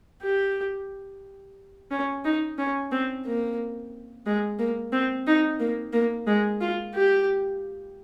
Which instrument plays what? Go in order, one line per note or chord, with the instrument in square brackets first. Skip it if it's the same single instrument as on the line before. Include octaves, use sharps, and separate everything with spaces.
[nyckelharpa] G4
C#4
D#4
C#4
C4
A#3
G#3
A#3
C4
D#4
A#3
A#3
G#3
F4
G4